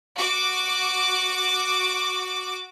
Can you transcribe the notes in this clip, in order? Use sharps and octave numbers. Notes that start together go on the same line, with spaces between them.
F#4 D6